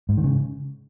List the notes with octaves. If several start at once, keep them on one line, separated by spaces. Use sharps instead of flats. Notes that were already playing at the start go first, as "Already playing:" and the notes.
G#2
D#3
C#3